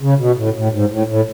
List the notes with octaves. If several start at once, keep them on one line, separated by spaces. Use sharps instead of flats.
C#3
B2
A2
A2
G#2
A2
A2